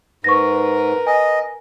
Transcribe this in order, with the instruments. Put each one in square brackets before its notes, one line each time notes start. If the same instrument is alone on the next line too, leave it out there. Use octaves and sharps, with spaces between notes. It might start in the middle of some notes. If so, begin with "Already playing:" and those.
[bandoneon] G#2 [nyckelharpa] A#4 B4 [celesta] C#6 A#6
[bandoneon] D#5 [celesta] G#5